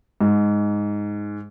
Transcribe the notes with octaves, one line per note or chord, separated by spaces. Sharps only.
G#2